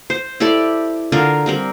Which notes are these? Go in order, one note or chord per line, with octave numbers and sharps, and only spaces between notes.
C5
E4 G4 A4 D5
D3 F4 A#4
G3 C4 A#4